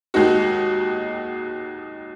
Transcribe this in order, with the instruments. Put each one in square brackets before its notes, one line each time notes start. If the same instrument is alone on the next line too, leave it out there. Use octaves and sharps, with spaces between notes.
[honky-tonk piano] D#2 D#3 G#3 D#4 F#4